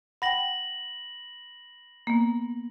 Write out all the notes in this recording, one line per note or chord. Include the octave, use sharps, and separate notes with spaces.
F#5 G5 B5 A#6 F#7
A#3 B3